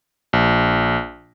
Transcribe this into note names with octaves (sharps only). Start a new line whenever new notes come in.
A#1